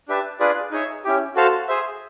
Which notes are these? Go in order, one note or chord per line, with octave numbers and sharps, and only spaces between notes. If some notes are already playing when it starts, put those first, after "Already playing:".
D4 G4 B4 E5 A5
D4 F4 G#4 B4 D5
D#4 G#4 C#5 E5
C#4 E4 G4
F#4 A4 C5 F5 A5
G#4 C5 E5